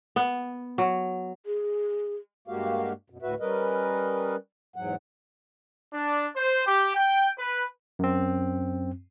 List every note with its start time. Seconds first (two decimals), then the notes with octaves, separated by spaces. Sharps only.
0.16 B3
0.78 F#3
1.46 G#4
2.48 G2 G#3 A#3 F#4 G4 F5
3.10 F#2 B2
3.22 D2 A2 F#4 B4 E5
3.40 G3 C#4 A#4 B4 D#5
4.76 E2 G#2 F#3 F#5
5.93 D4
6.36 C5
6.67 G4
6.96 G5
7.38 B4
7.99 F#2 C4